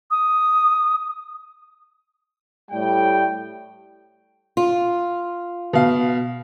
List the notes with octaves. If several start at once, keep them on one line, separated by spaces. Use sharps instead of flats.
D#6
A2 G3 G5
F4
B2 F5